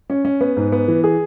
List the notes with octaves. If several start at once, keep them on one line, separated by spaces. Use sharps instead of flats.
C#4
C#4
B3
G#2
B3
E3
G#4